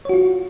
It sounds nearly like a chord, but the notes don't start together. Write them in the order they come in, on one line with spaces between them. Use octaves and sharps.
C#5 F#4 F4